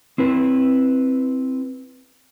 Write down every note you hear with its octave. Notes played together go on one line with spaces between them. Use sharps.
C4 E4 B4